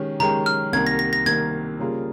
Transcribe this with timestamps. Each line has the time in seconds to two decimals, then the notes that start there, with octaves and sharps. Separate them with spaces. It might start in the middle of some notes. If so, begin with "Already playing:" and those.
Already playing: D#3 G#3 C#4 G4
0.20 D#3 G#3 C#4 G4 A#5
0.46 F6
0.73 C2 C3 D#3 A#3 G#6
0.87 A#6
0.99 A#6
1.13 A#6
1.26 C2 C3 D#3 A#3 G#6
1.80 C#3 G3 A#3 F4 G#4